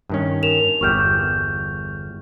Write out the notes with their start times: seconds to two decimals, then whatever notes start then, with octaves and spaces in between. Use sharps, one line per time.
0.10 G2 D#3 C#4
0.43 A#4 E7 F7
0.81 G1 E2 G4 C#6 F6 G6